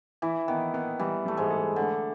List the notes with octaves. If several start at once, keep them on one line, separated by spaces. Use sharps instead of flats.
E3 E4
D#3 B3
D#3 B3
E3 G3
G3 A3
G#2 G#3
A4
D3 A3